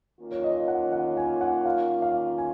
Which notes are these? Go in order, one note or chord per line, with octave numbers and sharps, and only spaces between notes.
D#3 A#3 C#4 F4
C#5
D#5
F#5
F#5
G#5
F#5
F5
F5
G#5